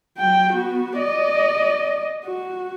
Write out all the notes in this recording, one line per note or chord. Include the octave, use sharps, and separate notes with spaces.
F#3 G5
B3 F#4
D5 D#5
F#4